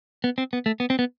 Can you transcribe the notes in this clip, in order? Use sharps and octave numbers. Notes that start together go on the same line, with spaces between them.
B3
C4
B3
A3
B3
C4
B3